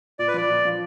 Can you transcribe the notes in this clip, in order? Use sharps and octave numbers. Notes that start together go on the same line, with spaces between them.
A#2 D5
B4
F3 D5
A#2
F3